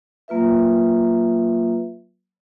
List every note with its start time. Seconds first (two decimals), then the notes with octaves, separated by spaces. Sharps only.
0.28 F#3 A#3 F4 B4 E5